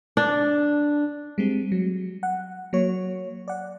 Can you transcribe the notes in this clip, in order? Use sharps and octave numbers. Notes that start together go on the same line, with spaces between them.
D4
G3 G#3 C4
F#3
F#5
F#3 A#3 C#5
D5 F#5